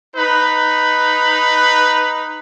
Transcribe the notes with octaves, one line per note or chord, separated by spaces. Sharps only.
D#4 B4